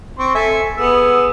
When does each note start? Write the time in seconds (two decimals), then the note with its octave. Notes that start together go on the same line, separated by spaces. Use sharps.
0.19 C4 C6 C#6
0.35 A4 E5 G#5
0.78 B3 G#4 E6